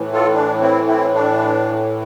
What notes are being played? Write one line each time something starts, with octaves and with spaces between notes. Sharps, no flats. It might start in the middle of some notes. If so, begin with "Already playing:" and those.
Already playing: A2 E3
F4 A4
D4
C4 E4
C4 E4
D4